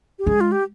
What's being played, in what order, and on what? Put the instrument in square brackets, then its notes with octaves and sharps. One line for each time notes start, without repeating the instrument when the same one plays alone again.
[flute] G4
[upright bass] G#3 [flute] G#4
[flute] F4
G4